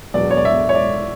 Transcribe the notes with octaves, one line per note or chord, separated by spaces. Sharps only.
E1 E2 B2 F#3 D5
C#5
D5
E5
C#5
D5